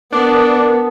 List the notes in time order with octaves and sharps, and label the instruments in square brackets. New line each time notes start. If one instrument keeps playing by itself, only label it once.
[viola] B3 [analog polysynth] D4 [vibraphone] A#4 A5